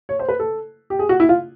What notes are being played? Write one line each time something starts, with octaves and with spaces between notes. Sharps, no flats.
C#5
C5
B4
A4
G4
G#4
F#4
E4
F4